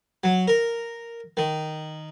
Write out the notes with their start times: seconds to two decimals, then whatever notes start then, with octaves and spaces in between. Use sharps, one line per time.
0.24 F#3
0.48 A#4
1.37 D#3